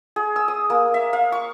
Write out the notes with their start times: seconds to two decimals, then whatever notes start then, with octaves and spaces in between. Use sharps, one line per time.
0.16 G#4
0.36 E6
0.48 D#6
0.70 A#3
0.94 E5
1.13 F5
1.32 C#6